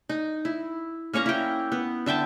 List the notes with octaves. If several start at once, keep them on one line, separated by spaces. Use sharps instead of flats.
D#4
E4
A#3 C#4 C#5 A#5
E4 G5
B3
D3 E5 G5 A5